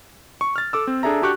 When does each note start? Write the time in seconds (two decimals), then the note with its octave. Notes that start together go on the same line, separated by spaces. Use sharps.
0.41 C#6
0.56 F6 A6
0.73 A4 D6 E6
0.87 C4
1.03 D4 G#4 A4 E5 A#5
1.22 D4 F#4 G4 C#6 F#6